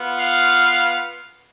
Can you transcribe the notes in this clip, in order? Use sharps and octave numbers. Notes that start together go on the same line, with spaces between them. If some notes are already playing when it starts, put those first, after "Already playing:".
Already playing: B3 F4
F5